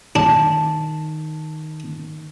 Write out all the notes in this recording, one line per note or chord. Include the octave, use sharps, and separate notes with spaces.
D#3 D4 A5